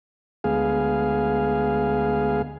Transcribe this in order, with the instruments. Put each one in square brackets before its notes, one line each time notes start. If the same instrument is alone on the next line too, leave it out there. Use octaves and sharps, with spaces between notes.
[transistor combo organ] D2 G#3 B3 G#4 F5